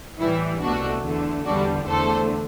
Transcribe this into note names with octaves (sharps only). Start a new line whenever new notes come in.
A2 E3 G3 E4
C2 B2 A3 D4 F#4
E2 D3 A3
E2 D3 G3 D4 F#4
E2 D3 A3 A4 C5